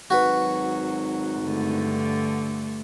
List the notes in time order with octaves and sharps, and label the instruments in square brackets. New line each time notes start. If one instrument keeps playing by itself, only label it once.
[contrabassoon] G#1 [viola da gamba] F#3 [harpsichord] F#4 B4
[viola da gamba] G2 D3 A3